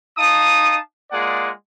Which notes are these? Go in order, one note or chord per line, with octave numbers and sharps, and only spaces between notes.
D#4 F5 A5 D#6
G#3 A#3 F4 G#4 D5 F#5